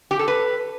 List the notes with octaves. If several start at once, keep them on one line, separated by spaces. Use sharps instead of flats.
G4
A4
B4